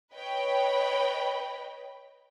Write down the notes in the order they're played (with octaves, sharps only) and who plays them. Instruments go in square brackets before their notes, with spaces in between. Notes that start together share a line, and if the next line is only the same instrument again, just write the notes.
[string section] B4 C#5 D#5 G5 B5